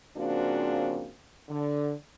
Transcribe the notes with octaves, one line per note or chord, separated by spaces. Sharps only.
C#3 F3 A#3 C4 D4 F#4
D3